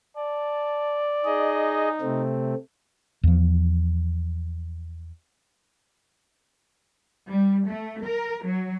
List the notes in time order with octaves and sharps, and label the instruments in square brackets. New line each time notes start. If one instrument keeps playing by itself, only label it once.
[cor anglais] D5 [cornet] A5
[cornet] D#4 [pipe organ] G#4 D#5
[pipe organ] C3 A3 C4
[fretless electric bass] E2 F3
[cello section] G3
A3
A#4
F#3